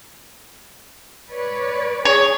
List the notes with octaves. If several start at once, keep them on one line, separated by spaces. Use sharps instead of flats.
B4 C#5 D5
G#4 C#5